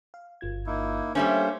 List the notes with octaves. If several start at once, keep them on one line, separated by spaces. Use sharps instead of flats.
F5
G1 F4 G#6
A#3 D#4 E4
G3 A3 A#3 C#4 D4 C5 F5